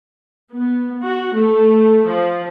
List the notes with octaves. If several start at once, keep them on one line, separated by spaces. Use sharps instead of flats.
B3
F#4
A3
F3